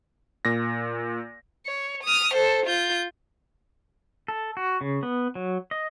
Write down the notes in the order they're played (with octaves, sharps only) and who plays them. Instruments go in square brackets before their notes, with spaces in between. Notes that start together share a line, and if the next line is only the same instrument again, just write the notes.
[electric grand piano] A#2 A#6
[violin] C#5
D#6 F6
A4 C5
F4 G6
[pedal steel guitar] A4
F#4
C#3
B3
F#3
D#5